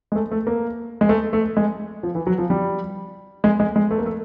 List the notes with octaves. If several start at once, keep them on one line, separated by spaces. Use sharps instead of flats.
G#3
A3
A3
A#3
G#3
A3
A3
G#3
F3
E3
F#3
F3
G3
G#3
G#3
G#3
A3
A#3
A3